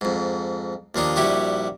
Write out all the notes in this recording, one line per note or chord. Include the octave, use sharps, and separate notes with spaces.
F2 G#2
D#2 F3 D4 D#4
A#1 G3 E4 F#4 G4